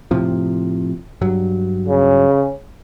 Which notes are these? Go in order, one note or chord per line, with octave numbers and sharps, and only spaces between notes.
A2 C3 F3
G2 F#3
C#3